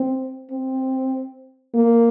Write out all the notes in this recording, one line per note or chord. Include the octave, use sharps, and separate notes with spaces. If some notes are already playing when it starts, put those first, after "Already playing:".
Already playing: C4
C4
A#3